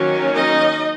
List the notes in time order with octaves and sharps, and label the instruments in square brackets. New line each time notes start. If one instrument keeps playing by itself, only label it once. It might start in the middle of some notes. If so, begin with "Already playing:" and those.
Already playing: [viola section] D#3 F#3 A#3 C#4
D#4 D#5